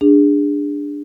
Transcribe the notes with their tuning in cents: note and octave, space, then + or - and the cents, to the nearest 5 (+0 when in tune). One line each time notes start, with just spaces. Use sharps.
D4 +0 G#4 -25